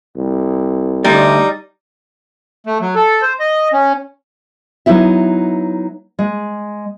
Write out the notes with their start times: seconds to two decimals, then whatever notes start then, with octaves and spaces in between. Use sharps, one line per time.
0.16 C2
1.04 D2 G3 D#4
2.66 A3
2.81 F#3
2.96 A4
3.22 C5
3.40 D#5
3.73 C#4
4.86 F#3 B3 D#4 E4 E5
6.19 G#3